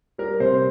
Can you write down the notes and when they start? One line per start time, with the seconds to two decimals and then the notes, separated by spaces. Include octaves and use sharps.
0.18 G3 A#4
0.40 C3 C5